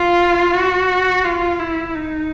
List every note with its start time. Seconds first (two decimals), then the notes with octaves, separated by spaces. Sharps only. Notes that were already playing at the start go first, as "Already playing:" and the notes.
Already playing: F4
0.54 F#4
1.25 F4
1.60 E4
1.95 D#4